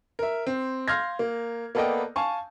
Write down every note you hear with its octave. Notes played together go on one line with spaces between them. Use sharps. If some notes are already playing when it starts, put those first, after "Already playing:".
A#4 E5
C4
F5 C6 F6 G6 G#6 A#6
A#3
A#3 B3 A4 D5 D#5 G5
F5 G#5 A5 C#6